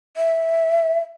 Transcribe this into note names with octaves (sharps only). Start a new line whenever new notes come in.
E5